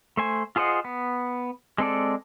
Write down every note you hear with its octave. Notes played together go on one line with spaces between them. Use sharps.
A3 C5 G#5
F4 G#4 C5 D#5 F#5
B3
G#3 C4 A4 D5